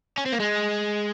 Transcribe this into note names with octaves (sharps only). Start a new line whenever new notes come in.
C#4
C4
A#3
G#3